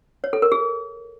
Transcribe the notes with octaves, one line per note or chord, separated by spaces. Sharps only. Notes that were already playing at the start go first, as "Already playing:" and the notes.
C#5
A4
A#4
G#4